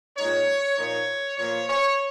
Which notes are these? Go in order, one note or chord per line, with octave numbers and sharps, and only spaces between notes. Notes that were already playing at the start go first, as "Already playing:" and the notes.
A#2 G#3 D#4 C#5
A#2 F3 A#3 D#4 C#5
A#2 F3 A#3 C#5
C#5